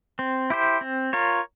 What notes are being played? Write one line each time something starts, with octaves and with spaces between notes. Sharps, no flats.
C4
E4 G4 C5
C4
F4 A#4 C#5